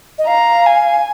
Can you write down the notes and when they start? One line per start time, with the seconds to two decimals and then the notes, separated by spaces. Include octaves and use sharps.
0.18 D#5
0.27 F5 A#5
0.67 G#5